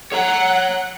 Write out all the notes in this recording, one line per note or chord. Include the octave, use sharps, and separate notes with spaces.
C#5 F#5 A#5